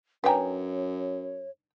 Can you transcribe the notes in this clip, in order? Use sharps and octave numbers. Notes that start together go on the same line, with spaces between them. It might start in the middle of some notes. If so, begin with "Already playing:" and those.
F#2 D4 D#4 B4 C#5 G5 G#5 A#5